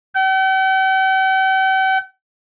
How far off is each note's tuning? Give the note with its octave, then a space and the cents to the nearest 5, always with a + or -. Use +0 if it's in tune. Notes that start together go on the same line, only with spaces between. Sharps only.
G5 -45